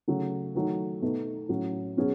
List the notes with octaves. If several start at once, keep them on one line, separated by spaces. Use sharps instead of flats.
C#3 F#3 A3
D#3 F#3 A3
B2 A3 D#4
A2 F#3 C#4
B2 F#3 C#4 G#4